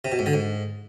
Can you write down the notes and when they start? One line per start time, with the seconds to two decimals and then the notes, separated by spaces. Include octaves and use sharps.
0.05 C3
0.12 B2
0.19 G#2
0.26 D3
0.33 G#2